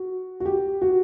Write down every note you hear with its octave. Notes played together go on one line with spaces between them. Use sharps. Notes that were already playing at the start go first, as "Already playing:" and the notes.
Already playing: F#4
F#4
G4
F#4